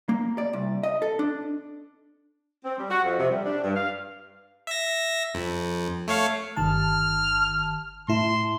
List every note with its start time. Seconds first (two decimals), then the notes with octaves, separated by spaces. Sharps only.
0.09 A#3
0.38 D5
0.53 C2
0.83 D#5
1.02 A4
1.19 D4
2.64 C4
2.78 G3
2.90 F#4
3.04 F2
3.18 C3
3.30 G3
3.45 D4
3.63 G2
3.76 F5
4.67 E5 A#6
5.34 F2
6.08 A3 C#5 F5
6.57 G1 D#3 A5 F6
8.08 A2 E4 C6